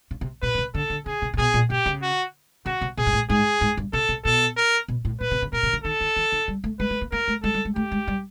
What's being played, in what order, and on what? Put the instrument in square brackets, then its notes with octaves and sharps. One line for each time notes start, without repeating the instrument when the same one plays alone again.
[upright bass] C#3
C3
[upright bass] B2 [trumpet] B4
[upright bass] B2
C3
[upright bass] D3 [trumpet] A4
[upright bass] D3
[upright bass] C#3 [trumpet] G#4
[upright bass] C3
C3
[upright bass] B2 [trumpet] G#4
[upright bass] A#2
[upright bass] B2 [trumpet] G4
[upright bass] C#3
[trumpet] F#4
[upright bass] C#3 [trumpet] F#4
[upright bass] C3
[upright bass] B2 [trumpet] G#4
[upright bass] G#2
A2
[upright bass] G#2 [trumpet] G#4
[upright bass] G#2
G2
[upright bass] C3 [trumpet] A4
[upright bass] C3
[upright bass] B2 [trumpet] A4
[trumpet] A#4
[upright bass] B2
A2
[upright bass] A#2 [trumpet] B4
[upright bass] C3
C#3
[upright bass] B2 [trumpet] A#4
[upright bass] C3
C#3
[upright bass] D#3 [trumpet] A4
[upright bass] D#3
E3
D#3
G3
A3
[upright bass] G#3 [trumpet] B4
[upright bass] A3
A#3
[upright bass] A#3 [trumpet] A#4
[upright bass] A3
[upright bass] G#3 [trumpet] A4
[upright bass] G3
G#3
[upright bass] A3 [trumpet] G4
[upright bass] G#3
G3